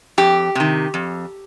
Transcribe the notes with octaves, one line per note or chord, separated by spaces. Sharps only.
F2 G4
C3 D#3
F2